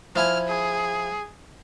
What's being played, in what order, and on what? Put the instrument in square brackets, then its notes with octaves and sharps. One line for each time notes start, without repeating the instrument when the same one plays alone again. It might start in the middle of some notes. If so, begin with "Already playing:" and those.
[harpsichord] F3 E4 G#5 [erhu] F6
[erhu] G#4